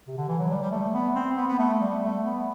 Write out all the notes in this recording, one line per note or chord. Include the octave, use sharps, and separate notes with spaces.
C3
D3
E3
F#3
G3
G3
A3
B3
C4
B3
B3
A3
G3
A3
B3